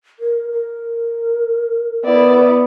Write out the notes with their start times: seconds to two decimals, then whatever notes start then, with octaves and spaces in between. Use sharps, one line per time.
0.20 A#4
0.51 A#4
2.04 B3 E4 D5